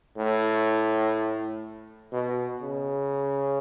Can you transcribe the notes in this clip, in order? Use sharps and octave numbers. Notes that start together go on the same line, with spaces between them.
A2
B2
C#3